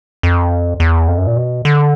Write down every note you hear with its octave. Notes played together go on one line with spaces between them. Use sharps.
F2
E2
F2
F#2
A#2
B2
D3